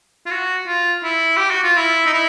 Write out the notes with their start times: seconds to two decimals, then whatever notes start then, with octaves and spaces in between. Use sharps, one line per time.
0.26 F4
0.31 F#4
0.67 F4
1.04 E4
1.37 G4
1.51 F#4
1.64 F4
1.77 E4
2.06 D#4
2.14 E4